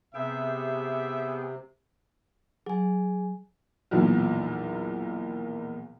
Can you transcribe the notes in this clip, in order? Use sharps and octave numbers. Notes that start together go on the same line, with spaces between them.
C3 B3 G#4 E5 G5
F#3 G#4 G#5
B1 E2 A#2 F3 A#3